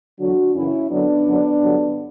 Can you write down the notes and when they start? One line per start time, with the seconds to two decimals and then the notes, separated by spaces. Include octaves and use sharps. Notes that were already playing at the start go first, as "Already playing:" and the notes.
0.19 E2 D3 F#3 D4 F#4
0.55 F#2 C#3 E3 C#4 E4
0.90 F#2 D3 F#3 B3 D4
1.26 F#2 D3 F#3
1.63 G2 D3 F#3